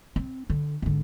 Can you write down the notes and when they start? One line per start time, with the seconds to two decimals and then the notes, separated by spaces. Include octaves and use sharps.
0.16 C4
0.50 D3
0.82 G#1 D3